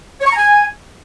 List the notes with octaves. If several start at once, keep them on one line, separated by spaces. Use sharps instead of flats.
C#5
C#6
A#5
G#5